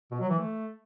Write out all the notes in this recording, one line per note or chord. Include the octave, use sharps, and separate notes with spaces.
B2
F#3
E3
A3